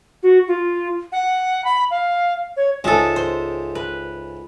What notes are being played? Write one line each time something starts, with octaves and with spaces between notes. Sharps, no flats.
F#4
F4
F#5
B5
F5
C#5
C#2 G#2 G#3 A4 E5
C5
B4